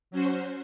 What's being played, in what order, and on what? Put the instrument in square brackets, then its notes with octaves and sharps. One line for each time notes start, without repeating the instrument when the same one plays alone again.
[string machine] F#3 C#4 F#4 C5